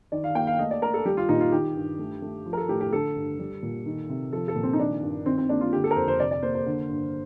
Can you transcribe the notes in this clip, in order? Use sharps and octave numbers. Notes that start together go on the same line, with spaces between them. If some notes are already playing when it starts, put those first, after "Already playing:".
D#3 D5
F5
A#3 G5
F5
A3 D#5
D5
A3 A#4
A4
G3 G4
F4
A#2 D#4
F4
D#3 G4
G2
A3
A3
F3
A#4
A4
A2 G4
G4
D3 A4
G2
G3
A#2
D#3
C3
F3 A4
A4
A#2
C4
D#4
D#3 D4
G2
D#3 C4
C4
A#3 D4
F4
D3 G4
A4
A#4
F2 C5
C5
C3 D5
D5
A#3 C5
C5
D3
G2